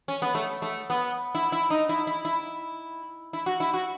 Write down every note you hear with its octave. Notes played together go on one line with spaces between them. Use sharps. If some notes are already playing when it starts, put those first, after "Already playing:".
C#4
B3
A3
A3
B3
E4
E4
D#4
E4
E4
E4
E4
F#4
E4
F#4